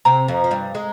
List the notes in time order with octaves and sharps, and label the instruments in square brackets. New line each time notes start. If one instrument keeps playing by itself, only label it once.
[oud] C3 C4 [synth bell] A#5
[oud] F2 F3
F3
G2 G3
G#3